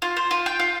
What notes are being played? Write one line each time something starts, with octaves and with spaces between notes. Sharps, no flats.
F4
C5
F4
G5
F4